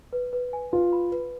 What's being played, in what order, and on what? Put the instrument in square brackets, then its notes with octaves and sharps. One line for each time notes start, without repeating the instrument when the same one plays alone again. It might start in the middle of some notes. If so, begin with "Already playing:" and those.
[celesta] B4
B4
G#5
[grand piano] F4 [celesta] B4
[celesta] B5
B4